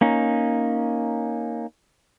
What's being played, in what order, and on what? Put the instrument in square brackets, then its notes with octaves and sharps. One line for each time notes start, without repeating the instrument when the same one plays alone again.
[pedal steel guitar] A#3 C#4 D#4